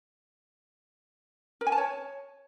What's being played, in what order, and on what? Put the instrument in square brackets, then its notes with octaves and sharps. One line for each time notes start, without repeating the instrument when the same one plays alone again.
[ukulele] A#4
G#5
A5
C#5